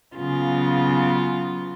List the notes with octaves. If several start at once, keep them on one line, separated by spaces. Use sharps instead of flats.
C#3 F#3 B3 F4